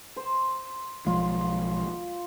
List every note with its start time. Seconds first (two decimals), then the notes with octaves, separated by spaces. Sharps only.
0.16 C5
1.06 B1 F3 G#3 F4